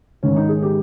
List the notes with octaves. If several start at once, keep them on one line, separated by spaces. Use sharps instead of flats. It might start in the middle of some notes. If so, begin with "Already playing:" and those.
G#2 D#3 C#4
D#4
G#4
G4